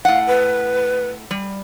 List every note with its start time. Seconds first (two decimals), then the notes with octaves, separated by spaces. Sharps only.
0.05 A2 F5 F#5
0.27 B4
1.31 G3